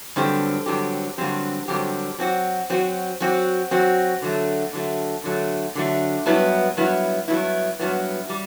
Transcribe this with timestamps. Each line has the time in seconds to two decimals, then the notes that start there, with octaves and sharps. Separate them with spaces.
0.16 G2 D3 F#3 C4 G4
0.66 G2 D3 F#3 C4 G4
1.18 G2 D3 F#3 C4 G4
1.68 G2 D3 F#3 C4 G4
2.19 F#3 C4 F#4
2.70 F#3 C4 F#4
3.20 F#3 C4 F#4
3.71 F#3 C4 F#4
4.22 D3 F#3 A3
4.73 D3 F#3 A3
5.24 D3 F#3 A3
5.75 D3 F#3 A3
6.26 G2 F#3 B3 E4
6.77 G2 F#3 B3 E4
7.28 G2 F#3 B3 E4
7.79 G2 F#3 B3 E4
8.29 G3